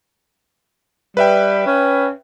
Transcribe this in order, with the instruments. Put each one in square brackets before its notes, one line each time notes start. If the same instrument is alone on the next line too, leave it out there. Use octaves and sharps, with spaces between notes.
[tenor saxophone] G3 [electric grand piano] B4 E5 G5
[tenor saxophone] C#4